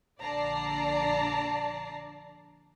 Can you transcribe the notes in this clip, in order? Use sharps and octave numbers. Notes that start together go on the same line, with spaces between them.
A#1 D3 D5 A5 A#5 C7